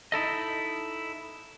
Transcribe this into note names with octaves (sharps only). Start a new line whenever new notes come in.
D#4 E4 A4 D#5